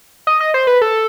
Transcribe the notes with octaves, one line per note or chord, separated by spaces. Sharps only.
D#5
D#5
C5
B4
A4